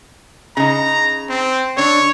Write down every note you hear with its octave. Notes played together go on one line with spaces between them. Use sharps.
C#3 D#4 A#5
C4
D3 D4 C#5